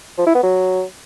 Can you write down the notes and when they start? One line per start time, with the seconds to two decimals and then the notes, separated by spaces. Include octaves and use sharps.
0.18 F3
0.27 E4
0.35 B3
0.43 F#3